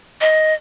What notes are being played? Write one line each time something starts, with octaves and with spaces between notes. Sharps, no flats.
D#5